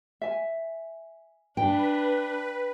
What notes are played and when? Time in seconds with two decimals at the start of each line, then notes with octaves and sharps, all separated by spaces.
0.22 E5 G#5
1.57 D4 B4 G5